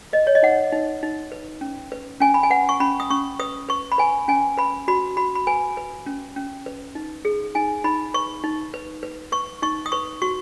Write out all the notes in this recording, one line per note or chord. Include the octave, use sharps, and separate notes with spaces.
B4 D#5
C#5
D#5
D#4 F#5
D#4
D#4
B4
C#4
B4
C#4 G#5
B5
G#5
B4 F#5
C#6
C#4 B5
D#6
C#4 C#6
B4 D#6
B4 C#6
B5
B4 G#5
C#4 G#5
B4 B5
F#4 B5
F#4 B5
B5
B4 G#5
B4
C#4
C#4
B4
D#4
G#4
D#4 G#5
D#4 B5
B4 C#6
D#4
B4
B4
B4 C#6
D#4 C#6
D#6
B4 C#6
F#4 C#6